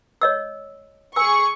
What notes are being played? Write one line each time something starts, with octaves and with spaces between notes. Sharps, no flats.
C#5 D#5 E6
G#4 G#5 C#6 E6